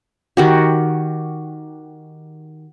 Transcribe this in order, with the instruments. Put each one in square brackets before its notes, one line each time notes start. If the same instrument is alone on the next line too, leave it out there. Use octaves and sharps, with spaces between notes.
[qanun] D#3 F#4 G4